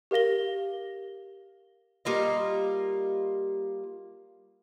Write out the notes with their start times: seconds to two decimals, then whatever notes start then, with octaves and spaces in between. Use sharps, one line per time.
0.11 G4 A#4 F5 A#6 G7
2.05 G3 A#3 F4 D#5